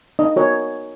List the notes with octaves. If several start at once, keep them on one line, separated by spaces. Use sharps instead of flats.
D#4 D#5
F#4 A#4 C#5